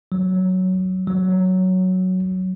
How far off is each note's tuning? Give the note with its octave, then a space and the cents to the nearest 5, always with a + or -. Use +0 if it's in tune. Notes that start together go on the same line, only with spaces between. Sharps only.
F#3 +0
F#3 +0